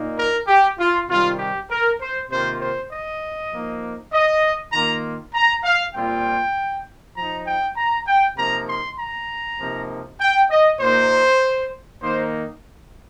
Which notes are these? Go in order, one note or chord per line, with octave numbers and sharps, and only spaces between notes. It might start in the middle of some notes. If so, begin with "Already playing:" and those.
Already playing: A#2 A#3 D#4
A#4
G4
F4
C3 D#3 G3 F4
G4
A#4
C5
C3 D#3 A#3 F4 C5
C5
D#5
F3 A#3 D#4
D#5
D#3 A#3 F4 A#5
A#5
F5
A#2 G3 C4 F4 G5
F3 D#4 A#5
G5
A#5
G5
C3 F3 A#3 D#4 A#5
C6
A#5
C3 F3 A#3 D#4
G5
D#5
A#2 A#3 D#4 C5
D#3 A#3 D#4 C5